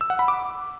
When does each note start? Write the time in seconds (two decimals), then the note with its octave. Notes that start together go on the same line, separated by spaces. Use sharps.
0.01 E6
0.10 F#5
0.19 B5
0.28 D6